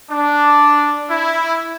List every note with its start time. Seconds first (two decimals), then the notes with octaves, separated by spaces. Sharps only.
0.11 D4
1.10 E4